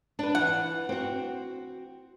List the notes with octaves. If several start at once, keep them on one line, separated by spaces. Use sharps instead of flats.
D4 B4
E3 F#5
C4 F#4